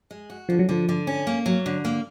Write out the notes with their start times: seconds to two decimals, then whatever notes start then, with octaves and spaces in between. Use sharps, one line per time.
0.11 G#3
0.30 F#4
0.49 D3 F3
0.59 F#3
0.69 D3 F3
0.89 D3
1.07 C#4
1.27 A#3
1.46 F#3
1.66 D3
1.85 A#3